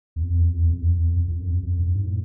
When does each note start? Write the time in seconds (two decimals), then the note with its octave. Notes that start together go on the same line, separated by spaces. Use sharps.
0.16 E2
0.23 F2
0.38 E2
0.54 F2
0.70 F2
0.81 E2
0.93 F2
1.16 F2
1.28 F2
1.40 F#2
1.51 F2
1.63 F2
1.79 F#2
1.95 G#2
2.07 A2